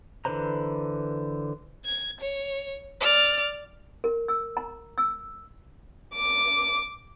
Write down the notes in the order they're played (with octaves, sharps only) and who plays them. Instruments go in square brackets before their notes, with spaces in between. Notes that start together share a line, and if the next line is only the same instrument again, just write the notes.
[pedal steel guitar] D3 E3 B4 C5 A#5
[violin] G#6
C#5
D5 F6
[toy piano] A#4
E6
A#5
E6
[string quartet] D6